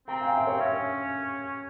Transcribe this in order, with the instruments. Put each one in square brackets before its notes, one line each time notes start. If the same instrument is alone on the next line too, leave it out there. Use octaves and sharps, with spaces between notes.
[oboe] C4 [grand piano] G5 A#5
[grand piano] F5 G#5
E5 G5
C#5 F5
[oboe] C#4 [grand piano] E5